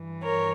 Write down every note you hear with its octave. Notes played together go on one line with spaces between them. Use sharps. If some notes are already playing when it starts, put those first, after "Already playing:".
Already playing: G2 E3
A#4 C#5